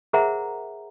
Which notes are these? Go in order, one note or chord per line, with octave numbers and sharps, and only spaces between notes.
G#4 A#4 C5 E5 F#5 A#5